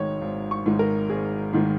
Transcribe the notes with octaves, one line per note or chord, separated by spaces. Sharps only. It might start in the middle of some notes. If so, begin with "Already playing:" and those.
Already playing: G#1 G#2 D#3 G#3 C#5
G#1
C#6
G#2 D#3 G#3
A#4
G#1 G#4
G#2 D#3 G#3